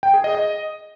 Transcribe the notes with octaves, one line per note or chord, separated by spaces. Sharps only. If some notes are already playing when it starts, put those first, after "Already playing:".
G5
G#4
D#5
D#5